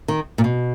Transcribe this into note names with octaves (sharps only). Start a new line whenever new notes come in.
D#3
A#2
B2